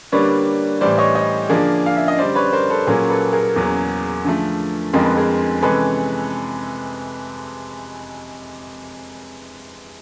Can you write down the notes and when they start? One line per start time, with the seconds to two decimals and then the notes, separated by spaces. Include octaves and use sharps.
0.12 D3 G3 A#3 D4 B4 C#5
0.81 A2 E3 G3 C5 D5
0.98 C#5 D#5
1.15 C#5 D#5
1.49 D3 F3 A#3 D4 G#4 A#4
1.86 F5
1.97 E5
2.08 D#5
2.18 F#2 D3 G3 C5 D5
2.35 B4 C#5
2.53 A#4 C5
2.70 A4 B4
2.87 A#2 F#3 A#3 C#4 G#4 A#4
3.10 A4 B4
3.33 G#4 A#4
3.56 E2 C#3 F#3 A#3
4.24 D3 F3 A3
4.93 F2 D3 F3 G#3 C4 A#4
5.05 B4
5.17 G#4 A#4
5.62 C3 E3 G#3 C#4 A4 B4